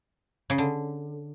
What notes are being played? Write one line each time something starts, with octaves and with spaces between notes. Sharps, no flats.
C#3
D3